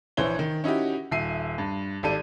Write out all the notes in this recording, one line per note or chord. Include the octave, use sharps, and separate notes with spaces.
A#1 E3 C5 C#5 G7
D#3
C#4 D#4 E4 F#4 G4
D#1 E5 C7 D#7
G2
G#1 G4 A4 D5 D#7